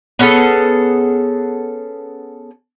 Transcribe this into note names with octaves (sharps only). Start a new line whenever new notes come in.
B3 C#4 G#4 A4